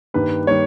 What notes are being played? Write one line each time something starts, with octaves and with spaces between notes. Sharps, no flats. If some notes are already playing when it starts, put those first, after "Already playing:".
G2 D#3 G3 A#3 B4
D#3 G3 A#3 C#5